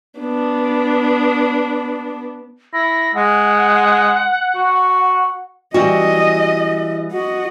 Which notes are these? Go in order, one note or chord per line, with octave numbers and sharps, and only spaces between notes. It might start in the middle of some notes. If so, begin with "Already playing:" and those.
B3 D4
E4 A#6
G#3 F#5
F#4
E3 G3 F#4 D#5
F#4 D#5